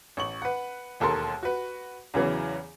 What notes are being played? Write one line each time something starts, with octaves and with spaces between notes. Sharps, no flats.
A1 C#6 F#7
B4 F#5
E1 D#2 A4 A#4 A5 C6
F#4 B4
E2 C#3 E3 F#3